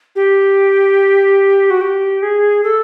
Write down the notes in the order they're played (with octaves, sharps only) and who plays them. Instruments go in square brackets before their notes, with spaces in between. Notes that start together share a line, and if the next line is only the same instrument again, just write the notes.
[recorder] G4
F#4
G4
G#4
A4